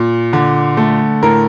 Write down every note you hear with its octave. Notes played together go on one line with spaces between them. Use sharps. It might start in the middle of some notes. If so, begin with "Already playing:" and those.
Already playing: A#2
D3
A3
A2 A#4